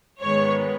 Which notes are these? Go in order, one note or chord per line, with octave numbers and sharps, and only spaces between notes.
G#2 D#3 G#3 B3 C#5